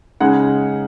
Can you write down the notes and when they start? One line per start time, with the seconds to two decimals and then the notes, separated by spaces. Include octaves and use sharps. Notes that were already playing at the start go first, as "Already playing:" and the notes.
0.20 C#3 G#3 D#4 F#5